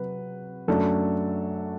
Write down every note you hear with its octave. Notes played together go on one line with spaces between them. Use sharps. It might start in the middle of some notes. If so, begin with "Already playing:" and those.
Already playing: C3 F#3 B4
F#2 F#3 A3 D4 A4